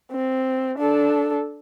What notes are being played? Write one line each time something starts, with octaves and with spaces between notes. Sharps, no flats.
C4
D4 A4